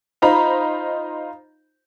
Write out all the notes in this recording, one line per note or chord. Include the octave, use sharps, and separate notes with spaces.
D#4 F4 C5 A#5 B5